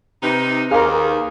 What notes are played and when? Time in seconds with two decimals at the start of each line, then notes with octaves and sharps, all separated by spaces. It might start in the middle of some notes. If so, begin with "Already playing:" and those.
0.23 C3 D#4 B4
0.71 D#2 G#4 A#4 F5 D6 D#6